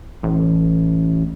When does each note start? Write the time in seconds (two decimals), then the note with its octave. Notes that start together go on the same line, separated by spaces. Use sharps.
0.23 A1